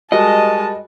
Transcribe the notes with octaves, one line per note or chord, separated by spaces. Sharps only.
G3 G#3 F#4 A#4 D#5 A5